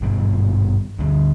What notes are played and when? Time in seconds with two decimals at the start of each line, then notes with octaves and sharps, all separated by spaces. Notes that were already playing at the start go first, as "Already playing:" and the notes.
0.01 G#1 G2 B2 G3
0.99 D2 D3 G3